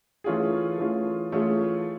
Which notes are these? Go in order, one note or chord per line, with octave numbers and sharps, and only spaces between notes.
E3 A3 C#4 F4 G#4
E3 A3 C#4 F4 G#4
E3 A3 C#4 F4 G#4